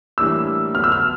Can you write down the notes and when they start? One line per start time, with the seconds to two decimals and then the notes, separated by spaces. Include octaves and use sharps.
0.18 A2 E3 G3 A#3 D4 E6
0.74 D3 F#3 B3 F6
0.84 E6
0.92 F6